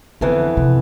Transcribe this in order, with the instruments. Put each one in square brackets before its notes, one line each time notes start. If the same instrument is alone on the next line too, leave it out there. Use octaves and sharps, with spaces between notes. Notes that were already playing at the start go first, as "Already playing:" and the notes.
[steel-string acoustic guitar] F2 E3 B3 [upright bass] D3
[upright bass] C3